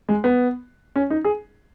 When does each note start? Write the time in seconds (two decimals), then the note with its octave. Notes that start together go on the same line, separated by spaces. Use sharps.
0.09 G#3
0.24 B3
0.96 C#4
1.10 D#4
1.24 G#4